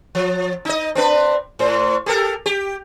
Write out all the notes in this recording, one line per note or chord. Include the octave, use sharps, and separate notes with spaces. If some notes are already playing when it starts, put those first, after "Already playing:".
F3
D#4 D#5
C4 D4 B4
A2 C5
G4 A4 A#4
G4